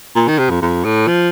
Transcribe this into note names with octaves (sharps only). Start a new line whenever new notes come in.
A#2
D#3
C3
F2
F2
A2
F3